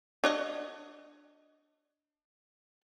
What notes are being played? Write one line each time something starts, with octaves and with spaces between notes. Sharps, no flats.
D4 C#5 D#5